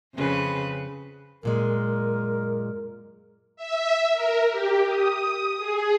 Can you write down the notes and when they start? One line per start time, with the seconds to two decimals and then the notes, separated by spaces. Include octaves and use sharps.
0.16 F2 C#3 B4
1.43 F#2 A#2 G#3 A#4
3.56 E5
4.13 A#4
4.51 G4
4.87 D#6
5.58 G#4